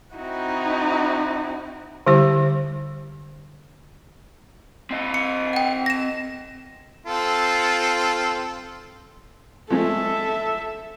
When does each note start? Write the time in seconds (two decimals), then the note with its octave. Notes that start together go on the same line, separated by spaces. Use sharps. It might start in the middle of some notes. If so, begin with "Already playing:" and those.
0.16 C4 D#4 E4 F#4
2.07 D3 G3 E4 G4 C5
4.91 C4 D#5
5.14 C#7
5.53 F#5 G5
5.86 A#6 E7
7.06 C4 F4 A4
9.70 F3 G#3 A3 A4 E5